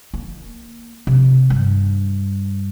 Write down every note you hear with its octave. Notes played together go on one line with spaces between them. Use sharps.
A#3
C3
G2